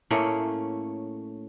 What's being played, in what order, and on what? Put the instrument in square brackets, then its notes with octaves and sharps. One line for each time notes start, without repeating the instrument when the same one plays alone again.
[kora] A2 A3 A#3 C#4